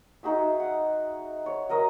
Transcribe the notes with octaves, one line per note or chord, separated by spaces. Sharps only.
D#4 F#4 G#4 E5
F#5
C#5
F#3 A#4 D#5